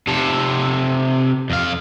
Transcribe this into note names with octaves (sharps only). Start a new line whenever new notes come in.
C3 A4
F2 F5